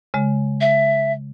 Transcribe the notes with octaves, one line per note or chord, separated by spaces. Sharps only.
C#3 G#3
E5